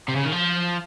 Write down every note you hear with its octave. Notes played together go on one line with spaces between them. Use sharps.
C3
C#3
D#3
F3